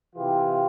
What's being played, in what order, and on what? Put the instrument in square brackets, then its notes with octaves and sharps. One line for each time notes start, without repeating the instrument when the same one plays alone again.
[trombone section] C3 E3 F4 G4